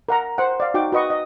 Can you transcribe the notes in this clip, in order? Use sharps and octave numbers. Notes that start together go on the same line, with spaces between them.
A#4 F#5 A#5
C5 F#5
D5 F5
D#4 F#4 G5 D6
F#4 B4 D#5 C#6
D#5